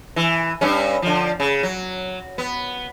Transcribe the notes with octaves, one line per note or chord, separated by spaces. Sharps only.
E3
G2 C#4
D3 F3
C#3
F#3
B3